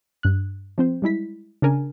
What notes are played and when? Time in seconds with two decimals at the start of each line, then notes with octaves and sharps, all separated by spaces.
0.23 G2 F#6
0.78 F3 C4 C5
1.02 G3 G#3 E4 B6
1.62 C#3 D4 A#4 G#5